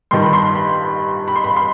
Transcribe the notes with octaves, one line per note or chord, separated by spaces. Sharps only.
G2 D#3 G3 C6
B5
C6
B5
B5
C6
B5
C6